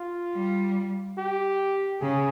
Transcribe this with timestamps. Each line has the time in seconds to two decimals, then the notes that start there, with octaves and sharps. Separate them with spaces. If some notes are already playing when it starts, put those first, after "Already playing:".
Already playing: F4
0.34 G3
1.18 G4
2.01 C#3 G#4